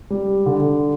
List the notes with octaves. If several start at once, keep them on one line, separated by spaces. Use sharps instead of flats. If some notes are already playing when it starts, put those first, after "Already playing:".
G3
D3